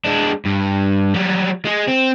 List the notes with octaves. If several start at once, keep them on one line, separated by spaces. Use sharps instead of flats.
G#3 D4
G2
F#3 G3
G#3 G#4
C4